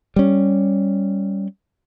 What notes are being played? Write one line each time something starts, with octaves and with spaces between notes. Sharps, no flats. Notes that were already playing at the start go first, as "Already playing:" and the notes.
G3 C#4